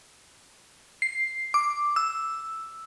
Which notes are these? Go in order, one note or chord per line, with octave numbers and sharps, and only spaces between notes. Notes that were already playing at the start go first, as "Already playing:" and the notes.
C7
D6
E6